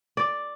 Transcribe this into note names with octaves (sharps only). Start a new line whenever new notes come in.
D5